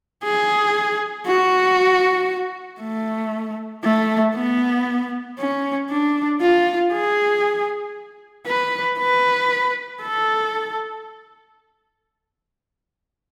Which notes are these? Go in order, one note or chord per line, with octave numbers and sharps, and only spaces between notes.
G#4
F#4
A3
A3
B3
C#4
D4
F4
G#4
B4
B4
A4